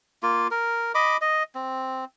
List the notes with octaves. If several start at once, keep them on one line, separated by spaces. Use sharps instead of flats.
A#3 F4
A#4
D#5 B5 D6
D#5
C4